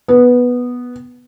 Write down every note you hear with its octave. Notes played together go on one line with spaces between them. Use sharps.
B3